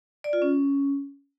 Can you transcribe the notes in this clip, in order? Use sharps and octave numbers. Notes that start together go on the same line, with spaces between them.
D5
F4
C#4